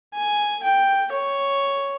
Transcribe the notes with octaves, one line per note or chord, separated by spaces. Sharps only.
G#5
G5
C#5